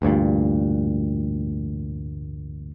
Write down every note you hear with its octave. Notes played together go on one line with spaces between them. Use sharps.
A1 D2 G2 A#2